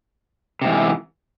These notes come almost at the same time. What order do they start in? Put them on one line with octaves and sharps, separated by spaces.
C3 G#2 E3